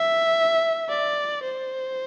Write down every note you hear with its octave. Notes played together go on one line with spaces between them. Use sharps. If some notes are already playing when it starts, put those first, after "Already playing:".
Already playing: E5
D5
C5